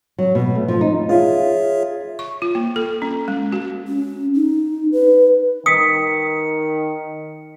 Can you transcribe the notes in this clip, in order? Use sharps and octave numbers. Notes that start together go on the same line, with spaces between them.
F#3
B2
A3
F3
D#4
F4 G#4 C#5 E5
C#6
F4
A#3
A4
C#4
G#3
F#4
C#4
D#4
B4
D#3 D#6 B6 C#7